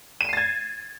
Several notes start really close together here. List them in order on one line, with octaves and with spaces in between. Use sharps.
D#7 E7 C7 A6 G#6